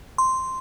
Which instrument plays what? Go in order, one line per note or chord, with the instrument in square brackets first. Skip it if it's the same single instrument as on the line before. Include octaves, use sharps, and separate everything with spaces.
[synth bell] C6